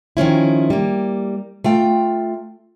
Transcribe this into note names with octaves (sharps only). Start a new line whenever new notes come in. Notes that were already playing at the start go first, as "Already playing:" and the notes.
D#3 F3 C#4 E4
G3 A#3
A3 F4 G5